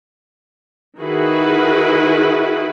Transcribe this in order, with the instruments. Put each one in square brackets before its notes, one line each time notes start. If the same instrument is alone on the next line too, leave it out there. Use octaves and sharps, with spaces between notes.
[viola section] D#3 E4 F#4 G#4 B4